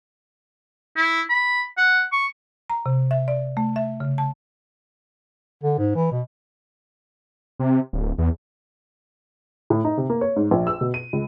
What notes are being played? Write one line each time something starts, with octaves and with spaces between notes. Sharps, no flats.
E4
B5
F#5
C#6
A#5
C3
E5
D5
A3
E5
C#3
A5
D3
G#2
E3
B2
C3
D1
E2
A2
D#4
C3
A#3
C#5
G#2
A#1
E6
B2
D#7
C#2